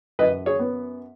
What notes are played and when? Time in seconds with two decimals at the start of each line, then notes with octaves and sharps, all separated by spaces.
0.19 F#2 B4 D#5
0.46 G#4 C#5
0.59 B3